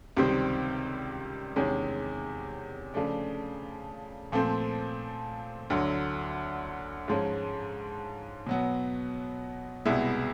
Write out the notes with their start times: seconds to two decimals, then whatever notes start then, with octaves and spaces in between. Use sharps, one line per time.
0.17 C#2 C3 D#3 G3 C4
1.56 E2 C3 D#3 G#3 C#4
2.94 C#3 F3 A3 D4
4.32 A#2 F3 A3 C4
5.70 D2 D3 F#3
7.08 G#2 F3 G#3 C#4
8.47 B2 F#3 B3
9.85 C2 B2 G#3 B3 E4